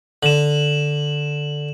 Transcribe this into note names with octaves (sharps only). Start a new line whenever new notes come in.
D3 E7 F#7